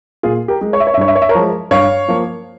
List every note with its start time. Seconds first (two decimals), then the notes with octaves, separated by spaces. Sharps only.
0.23 A#2 F4 G#4
0.48 G4 A#4
0.61 G#3
0.73 C#5
0.80 E5
0.87 C#5
0.94 E5
0.97 G2 C#5
1.08 E5
1.16 C#5
1.22 E5
1.29 A#4 C#5
1.35 F3 G#3
1.71 G2 C#5 F5
2.08 F3 A#3